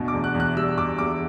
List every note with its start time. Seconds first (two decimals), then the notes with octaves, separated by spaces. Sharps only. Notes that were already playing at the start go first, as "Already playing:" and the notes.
Already playing: D2 B2
0.08 D6
0.13 E2
0.24 F#6
0.35 E2
0.40 F#6
0.56 G3 E6
0.78 B2 D6
0.98 E2 D6